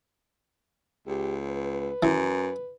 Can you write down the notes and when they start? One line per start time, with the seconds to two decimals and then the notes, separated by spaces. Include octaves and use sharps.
1.07 C#2 G4
1.49 B4
2.03 F#2 E3